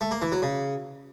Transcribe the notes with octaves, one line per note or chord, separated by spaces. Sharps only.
A3
A#3
E3
F#3
C#3